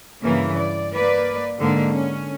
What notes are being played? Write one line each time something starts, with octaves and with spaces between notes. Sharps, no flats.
G2 C#3 E3 A#3
D5
A#3 B4 D5
G#2 D3 A#3
C#4